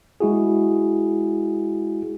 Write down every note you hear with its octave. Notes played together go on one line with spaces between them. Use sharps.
G#3 E4 F#4 G#4